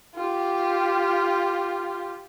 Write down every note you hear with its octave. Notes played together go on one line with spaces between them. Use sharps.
F4 G4